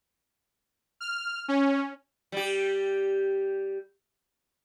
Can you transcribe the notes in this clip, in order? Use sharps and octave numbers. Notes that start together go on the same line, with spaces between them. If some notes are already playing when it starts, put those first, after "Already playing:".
F6
C#4
G3 G4